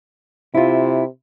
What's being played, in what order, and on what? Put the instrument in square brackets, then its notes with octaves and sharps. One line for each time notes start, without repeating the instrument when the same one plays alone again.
[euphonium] C3 [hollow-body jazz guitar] E4 F4